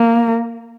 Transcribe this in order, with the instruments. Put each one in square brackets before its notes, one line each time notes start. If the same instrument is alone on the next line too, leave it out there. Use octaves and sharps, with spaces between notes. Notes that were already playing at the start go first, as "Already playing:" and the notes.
Already playing: [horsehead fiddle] A#3